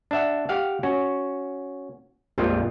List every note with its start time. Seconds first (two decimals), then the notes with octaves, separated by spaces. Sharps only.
0.11 D4 E5 F#5
0.49 G4 F5 F#5
0.83 C#4 F#4
2.38 A#1 F2 G3 G#3 F4